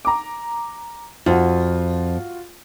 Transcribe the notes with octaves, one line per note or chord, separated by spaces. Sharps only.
A#5 D6
F2 F4 F#4